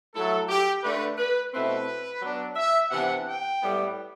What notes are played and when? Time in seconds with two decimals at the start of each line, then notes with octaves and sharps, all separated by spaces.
0.14 F#3 A3 E4 A4
0.49 G4
0.83 D3 A3 D4 B4
1.18 B4
1.53 B2 A3 C4 E4 B4
2.22 F#3 B3 D4
2.56 E5
2.91 C3 E3 B3 D4 F#5
3.26 G5
3.60 A2 G3 B3